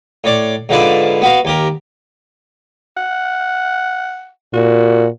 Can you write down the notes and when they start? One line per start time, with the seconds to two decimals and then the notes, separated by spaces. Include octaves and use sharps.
0.24 A2 C#5 D5
0.69 G#2 D3 F3 E4 B4 D5
1.22 B3 F#4 F5
1.45 D#2 G4 A#4
2.97 F#5
4.54 A#2 F#4